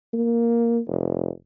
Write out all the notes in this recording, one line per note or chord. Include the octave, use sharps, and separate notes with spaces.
A#3
F1